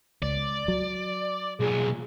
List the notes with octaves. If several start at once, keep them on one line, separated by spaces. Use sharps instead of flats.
C#2 D5
F#3
B1 A#2 G#4